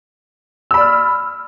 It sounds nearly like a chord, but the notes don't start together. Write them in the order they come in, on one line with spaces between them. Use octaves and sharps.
E6 B5 D5 F6